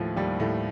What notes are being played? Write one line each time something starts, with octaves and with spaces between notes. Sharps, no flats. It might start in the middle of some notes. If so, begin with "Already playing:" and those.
Already playing: D#2 A2 F3 A3
D#2 G3
A2 A3